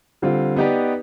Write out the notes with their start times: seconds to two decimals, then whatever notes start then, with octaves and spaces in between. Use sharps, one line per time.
0.22 D3 G3 C4 F4
0.56 B3 D#4 G4 B4 D5